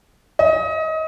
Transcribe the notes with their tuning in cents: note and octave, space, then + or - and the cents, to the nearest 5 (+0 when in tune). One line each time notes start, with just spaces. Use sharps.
D#5 +30